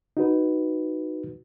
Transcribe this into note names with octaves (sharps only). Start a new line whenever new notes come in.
D#4 F#4 B4